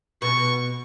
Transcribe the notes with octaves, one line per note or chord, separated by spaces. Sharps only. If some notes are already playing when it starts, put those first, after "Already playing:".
B2 C#6